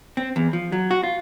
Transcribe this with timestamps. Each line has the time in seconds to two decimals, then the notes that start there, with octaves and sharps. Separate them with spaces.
0.17 C4
0.36 E2
0.53 F3
0.72 F#3
0.91 F#4
1.03 F4